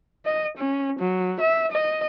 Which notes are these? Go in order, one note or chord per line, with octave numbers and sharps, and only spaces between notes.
D#5
C#4
F#3
E5
D#5